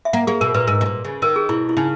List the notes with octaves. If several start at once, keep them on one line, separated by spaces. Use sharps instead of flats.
E5
A#3 F#5
A#3 G#4
B2 A#4
A#2 B4
G#2 A#4
B2
A#2
C#3
D#3 A#4
G#4
B2 E4
E4
C#3 D#4